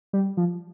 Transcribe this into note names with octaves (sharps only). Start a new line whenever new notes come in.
G3
F3